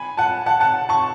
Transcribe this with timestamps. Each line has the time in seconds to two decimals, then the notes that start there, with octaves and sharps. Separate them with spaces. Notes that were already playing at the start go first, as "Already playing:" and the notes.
Already playing: G#5 B5
0.17 F#5 A5
0.46 F#5 A5
0.60 F#5 A5
0.89 A5 C#6